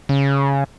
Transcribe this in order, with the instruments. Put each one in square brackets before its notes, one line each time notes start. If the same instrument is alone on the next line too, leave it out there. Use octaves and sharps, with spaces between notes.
[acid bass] C#3